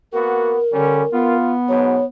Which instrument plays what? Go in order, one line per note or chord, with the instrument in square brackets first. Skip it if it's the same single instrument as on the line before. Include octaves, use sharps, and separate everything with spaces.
[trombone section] A#3 B3 F#4 [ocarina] A#4
[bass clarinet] D3 [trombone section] G3 C#4
[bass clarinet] B3 [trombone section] F4
[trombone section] G#2 B2 F#3 [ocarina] C#5